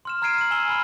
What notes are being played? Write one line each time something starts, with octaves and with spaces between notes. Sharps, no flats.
C6 F6 E7
A#5 F6 G#6 C7 D7 D#7
D#7 F#7
G#5 E6 F6 E7 G7
G#5 B5 F6